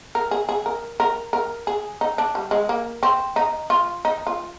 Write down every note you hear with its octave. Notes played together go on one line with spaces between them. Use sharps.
A#4
G#4
G#4
A#4
A#4
A#4
G#4
D#4
D4
G3
G#3
A#3
C4
D#4
F4
D#4
F4